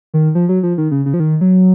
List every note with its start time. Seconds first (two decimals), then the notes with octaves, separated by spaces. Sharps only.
0.14 D#3
0.35 F3
0.49 F#3
0.63 F3
0.78 D#3
0.91 C#3
1.06 C#3
1.14 F3
1.20 D#3
1.41 F#3